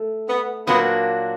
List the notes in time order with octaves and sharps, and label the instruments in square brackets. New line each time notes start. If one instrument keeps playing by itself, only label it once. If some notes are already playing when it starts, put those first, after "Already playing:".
Already playing: [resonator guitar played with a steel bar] A3
[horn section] B3
[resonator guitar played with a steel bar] A#2 F#3 A#3 D4 [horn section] B3